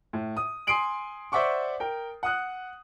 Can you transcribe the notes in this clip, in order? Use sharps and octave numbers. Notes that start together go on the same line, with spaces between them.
A2
D#6
G#5 C6 D#6 C7 D7 F#7
C5 D5 E5 F#5 C#6 D6
A#4 G5
F#5 D#6 F#6